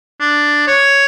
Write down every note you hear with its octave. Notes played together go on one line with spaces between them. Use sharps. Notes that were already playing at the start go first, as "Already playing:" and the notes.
D4
C#5